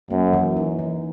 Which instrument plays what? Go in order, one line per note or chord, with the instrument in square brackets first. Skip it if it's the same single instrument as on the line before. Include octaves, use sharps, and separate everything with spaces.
[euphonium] F#2 [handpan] A#3
[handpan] E3
D#4
E3